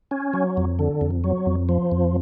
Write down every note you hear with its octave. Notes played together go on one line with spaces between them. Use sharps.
C#4
F#3
F2
D3
F2
F#3
F2
F3
F2